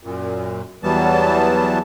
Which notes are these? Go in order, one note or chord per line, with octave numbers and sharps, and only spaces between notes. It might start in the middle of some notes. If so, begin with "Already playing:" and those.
F#2 A#2
E2 E3 F#3 G3 B3 A5